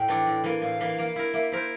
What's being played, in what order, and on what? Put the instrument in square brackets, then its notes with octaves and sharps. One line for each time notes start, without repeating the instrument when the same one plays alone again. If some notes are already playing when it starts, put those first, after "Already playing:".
Already playing: [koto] A2 [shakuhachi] G5
[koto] E3 A3 D4 A4
A2
E3 A#3
[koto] A2 [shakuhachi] F5
[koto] E3 A#3
A#3
E4 A#4
[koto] A#3 [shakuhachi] E5
[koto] E4 A#4 [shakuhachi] C5